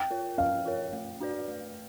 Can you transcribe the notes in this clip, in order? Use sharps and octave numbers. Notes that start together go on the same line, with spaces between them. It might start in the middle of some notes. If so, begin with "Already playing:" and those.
Already playing: G5
F4 A#4 C#5
C#4 F5
F4 A#4 C#5
A3
D4 F#4 B4 D5
A3